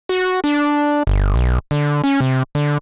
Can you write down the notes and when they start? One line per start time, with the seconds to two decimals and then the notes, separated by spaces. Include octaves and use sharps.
0.09 F#4
0.44 D4
1.07 G1
1.35 B1
1.71 D3
2.04 C#4
2.20 C3
2.55 D3